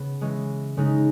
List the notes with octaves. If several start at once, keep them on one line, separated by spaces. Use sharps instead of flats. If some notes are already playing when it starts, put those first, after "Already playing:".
Already playing: C#3 B3
E3 G#3 C#4
C#3 G#3 D#4